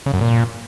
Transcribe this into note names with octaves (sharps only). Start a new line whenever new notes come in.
C#3
F#2
A#2